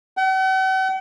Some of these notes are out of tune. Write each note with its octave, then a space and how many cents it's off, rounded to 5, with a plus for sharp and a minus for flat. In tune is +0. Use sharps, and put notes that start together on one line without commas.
F#5 +45